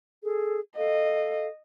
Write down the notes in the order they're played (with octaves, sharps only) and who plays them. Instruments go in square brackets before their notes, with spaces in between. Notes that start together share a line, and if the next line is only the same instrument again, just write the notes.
[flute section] G#4 A4
[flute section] A4 F5 [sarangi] D#5